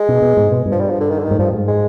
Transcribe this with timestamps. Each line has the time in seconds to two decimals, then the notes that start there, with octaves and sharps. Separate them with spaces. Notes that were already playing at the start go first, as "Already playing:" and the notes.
Already playing: G#3
0.09 B2
0.22 B2
0.37 G#2
0.52 B2
0.66 G2
0.72 F3
0.80 G3
0.90 F3
1.00 D3
1.10 D#3
1.19 D3
1.25 D#3
1.31 G#2
1.39 G2 F3
1.54 G#2
1.68 G#3